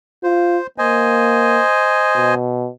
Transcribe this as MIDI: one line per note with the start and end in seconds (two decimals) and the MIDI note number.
0.23 0.58 65
0.23 0.67 72
0.78 1.61 58
0.78 2.34 72
0.78 2.34 75
0.78 2.34 80
2.16 2.69 47